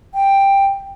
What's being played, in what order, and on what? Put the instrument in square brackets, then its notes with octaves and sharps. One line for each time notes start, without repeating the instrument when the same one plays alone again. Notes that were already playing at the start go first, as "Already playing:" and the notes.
[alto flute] G5